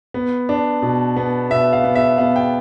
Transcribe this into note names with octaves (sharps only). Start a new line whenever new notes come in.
B3
D4
B2
B3
B2 E5
F5
B3
E5
B3 F5
G5